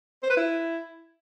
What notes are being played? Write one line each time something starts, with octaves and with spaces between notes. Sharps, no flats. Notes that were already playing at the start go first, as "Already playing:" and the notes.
C5
B4
E4